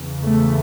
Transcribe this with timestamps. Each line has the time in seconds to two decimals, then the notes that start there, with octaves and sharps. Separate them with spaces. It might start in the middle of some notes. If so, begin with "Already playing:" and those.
Already playing: E2 C#3
0.24 A3